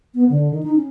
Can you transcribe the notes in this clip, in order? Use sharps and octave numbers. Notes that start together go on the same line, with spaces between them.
B3
D3
D#3
D#4
C#4